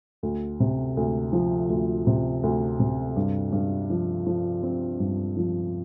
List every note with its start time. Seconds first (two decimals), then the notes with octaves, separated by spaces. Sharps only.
0.23 D2
0.60 C3
0.97 D2
1.33 F3
1.70 D2
2.07 C3
2.43 D2
2.80 C3
3.16 G2
3.52 G2
3.90 F3
4.27 F3
4.63 C4
5.00 G2
5.36 F3